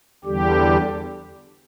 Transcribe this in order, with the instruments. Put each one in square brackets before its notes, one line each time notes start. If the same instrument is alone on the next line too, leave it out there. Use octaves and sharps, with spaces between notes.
[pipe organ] E2 D3 G3 G4